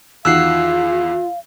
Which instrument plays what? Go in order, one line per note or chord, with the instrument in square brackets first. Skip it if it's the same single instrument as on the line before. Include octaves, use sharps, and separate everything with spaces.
[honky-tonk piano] E2 D#3 F#4 [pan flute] F4 [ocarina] F5 [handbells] E6 F#6 C7